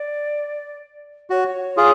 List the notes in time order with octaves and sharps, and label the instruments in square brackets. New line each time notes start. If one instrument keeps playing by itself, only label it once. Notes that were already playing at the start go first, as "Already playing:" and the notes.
Already playing: [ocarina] D5
[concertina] F#4 [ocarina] C#5
[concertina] F4 G#4